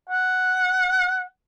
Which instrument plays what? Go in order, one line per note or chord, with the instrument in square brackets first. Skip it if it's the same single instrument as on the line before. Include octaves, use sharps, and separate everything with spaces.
[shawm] F#5